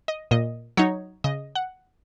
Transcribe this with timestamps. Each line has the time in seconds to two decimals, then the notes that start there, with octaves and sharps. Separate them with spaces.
0.08 D#5
0.31 A#2 D#5
0.77 F#3 D#4 C#5
1.24 C#3 D#5
1.55 F#5